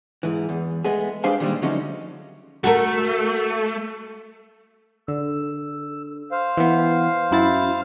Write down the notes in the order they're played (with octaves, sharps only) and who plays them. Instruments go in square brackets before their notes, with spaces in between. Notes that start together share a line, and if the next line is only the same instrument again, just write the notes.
[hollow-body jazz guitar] G#2 E3
E2
G#3 A3 B3 G#4
G#3 D4 G4 C5 F5 G#5
A#2 D#3 G3 G#3
D3 F3 F#3 A3 C#4 D#4
[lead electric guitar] A3 [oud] F#4 A4 A#4
[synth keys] D3 [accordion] E6
[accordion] C5 F5
[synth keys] E3 B3
F#2 E4 A6